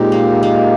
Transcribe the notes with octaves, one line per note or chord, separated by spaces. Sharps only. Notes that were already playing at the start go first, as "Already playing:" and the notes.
Already playing: A#2 G#3 C4 D#4 G4
A#3
A#3